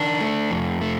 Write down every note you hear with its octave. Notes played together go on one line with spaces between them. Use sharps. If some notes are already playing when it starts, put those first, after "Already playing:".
Already playing: D#3 D4
A3
F2
A3